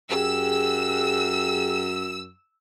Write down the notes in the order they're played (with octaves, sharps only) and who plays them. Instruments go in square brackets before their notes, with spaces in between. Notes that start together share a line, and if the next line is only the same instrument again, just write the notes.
[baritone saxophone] F#2 [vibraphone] G4 G#4 G5 [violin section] E6